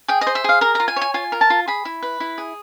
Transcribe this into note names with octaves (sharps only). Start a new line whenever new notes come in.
G#4 G5
D#5
C5
E5
G#4 F5
A#4 A#5
A#5
F4
G#5
C#5
G#5
F4 G#5
A#4
A5
F4
G#4 B5
E4
B4
E4
G#4